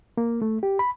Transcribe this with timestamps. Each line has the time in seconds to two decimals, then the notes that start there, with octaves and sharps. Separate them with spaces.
0.17 A#3
0.42 A3
0.63 G4
0.79 B5